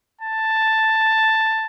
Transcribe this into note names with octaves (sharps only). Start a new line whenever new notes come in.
A5